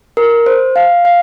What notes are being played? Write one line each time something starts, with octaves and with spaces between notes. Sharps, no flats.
A#4
C5
F5
F5